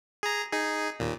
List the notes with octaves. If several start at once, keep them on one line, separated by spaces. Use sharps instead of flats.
G#4 A#5
D#4 G#4
D#2 A#2